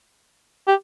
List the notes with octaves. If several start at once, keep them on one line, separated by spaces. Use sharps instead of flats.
G4